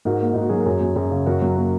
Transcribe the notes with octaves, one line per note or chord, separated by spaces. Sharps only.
G#2 F#4 A#4
A#3
G#2 D#4
F#4
F#3 G#4
A#4
F#2 G#4 C#5
F#3
F#2 G#4 C#5
C#3
F#2 F#4 A#4
F#3
A#3